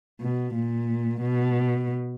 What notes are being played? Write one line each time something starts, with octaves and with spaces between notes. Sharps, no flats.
B2
A#2
B2